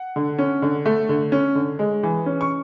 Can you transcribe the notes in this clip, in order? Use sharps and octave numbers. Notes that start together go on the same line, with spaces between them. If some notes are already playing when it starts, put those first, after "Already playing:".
Already playing: F#5
D3
C#4
D3
A3
D3
C#4
D3
G#3
E3
C#4
C#6